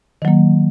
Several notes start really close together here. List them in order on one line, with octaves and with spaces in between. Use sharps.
D#3 F#3 A#3